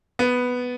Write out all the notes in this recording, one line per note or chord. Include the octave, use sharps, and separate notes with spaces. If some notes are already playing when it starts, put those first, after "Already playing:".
B3